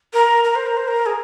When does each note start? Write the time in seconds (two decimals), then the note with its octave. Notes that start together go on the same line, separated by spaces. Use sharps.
0.13 A#4
0.44 A#4
0.56 C5
0.66 A#4
0.77 C5
0.88 A#4
1.06 G#4